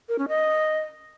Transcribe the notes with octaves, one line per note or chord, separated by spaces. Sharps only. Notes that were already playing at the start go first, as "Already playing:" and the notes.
A#4
C#4
D#5